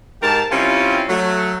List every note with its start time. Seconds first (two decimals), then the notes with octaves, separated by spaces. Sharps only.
0.22 G#2 G#3 G4 A#4 A5
0.51 C3 G3 C4 C#4 E4 F4
1.09 F#3 A3